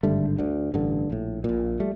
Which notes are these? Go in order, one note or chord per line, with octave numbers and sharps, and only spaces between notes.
G#1 G2 D3 G3 A3
D2 D3
A1 G2 D3
A#1 A2
A#1 A#2
G3 A3